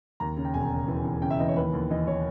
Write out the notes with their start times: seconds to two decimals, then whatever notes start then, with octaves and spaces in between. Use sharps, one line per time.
0.20 D#2 A#5
0.37 C#3
0.45 G5
0.54 E1 G#5
0.72 C#3
0.88 E3
1.05 E3
1.22 C#3 G5
1.30 E5
1.39 E3 D#5
1.48 C#5
1.56 D#2 B4
1.73 D#2
1.91 E3 D#5
2.07 E3 C#5